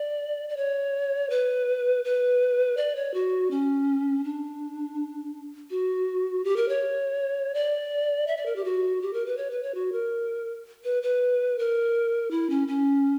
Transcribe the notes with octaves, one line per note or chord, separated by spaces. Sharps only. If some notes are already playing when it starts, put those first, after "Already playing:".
Already playing: D5
D5
C#5
B4
B4
D5
C#5
F#4
C#4
D4
F#4
G4
A#4
C#5
D5
E5
D5
A#4
G4
F#4
G4
A#4
B4
C#5
B4
C#5
F#4
A#4
B4
B4
A#4
E4
C#4
C#4